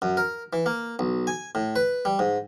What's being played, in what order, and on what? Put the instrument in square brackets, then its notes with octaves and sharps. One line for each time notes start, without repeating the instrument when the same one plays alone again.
[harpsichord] F#2
A#4
E3
A#3
B1
G#5
A2
B4
G3
G#2